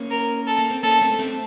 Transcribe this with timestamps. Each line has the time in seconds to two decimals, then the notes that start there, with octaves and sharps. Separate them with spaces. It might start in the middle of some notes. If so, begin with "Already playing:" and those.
Already playing: A#3 C#4
0.11 A#4
0.47 A4
0.58 A#3
0.70 C4
0.83 A#3 C#4 A4
1.01 A3 C4
1.19 A3 C4